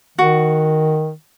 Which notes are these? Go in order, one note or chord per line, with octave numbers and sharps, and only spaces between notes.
D#3 F#4